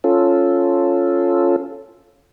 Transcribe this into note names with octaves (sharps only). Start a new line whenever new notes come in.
C#4 F4 A4